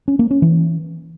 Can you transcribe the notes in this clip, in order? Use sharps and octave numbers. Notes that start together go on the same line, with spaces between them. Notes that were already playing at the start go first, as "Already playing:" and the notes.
C#4
A#3
C#4
E3